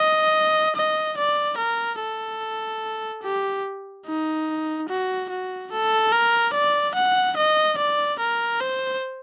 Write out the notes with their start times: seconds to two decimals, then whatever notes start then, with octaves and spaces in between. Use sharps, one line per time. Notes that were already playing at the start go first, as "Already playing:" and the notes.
Already playing: D#5
0.76 D#5
1.18 D5
1.58 A#4
2.00 A4
3.23 G4
4.06 D#4
4.89 F#4
5.30 F#4
5.72 A4
6.12 A#4
6.54 D5
6.95 F#5
7.37 D#5
7.78 D5
8.19 A#4
8.60 C5